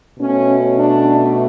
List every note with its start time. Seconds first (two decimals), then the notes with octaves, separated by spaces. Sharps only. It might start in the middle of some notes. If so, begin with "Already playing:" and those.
0.19 B2 A3 C#4
0.76 D4